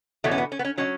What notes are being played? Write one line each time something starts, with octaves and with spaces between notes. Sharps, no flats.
E2 B2 F#3 A3
C#4
B3
C#4
B3
C#4
B2 F#3 C#4